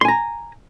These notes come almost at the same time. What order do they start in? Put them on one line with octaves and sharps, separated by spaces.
C6 G#5 A#5